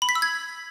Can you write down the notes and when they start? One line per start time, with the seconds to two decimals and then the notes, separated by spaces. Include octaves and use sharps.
0.02 B5
0.09 B6
0.15 E6
0.22 G#6